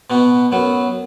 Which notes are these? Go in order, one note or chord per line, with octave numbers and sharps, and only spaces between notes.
B2 B3 F#4
F#2 F#3 B3